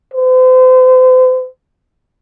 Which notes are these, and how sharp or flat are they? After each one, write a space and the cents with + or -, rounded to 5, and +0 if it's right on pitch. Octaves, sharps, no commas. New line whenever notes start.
C5 -40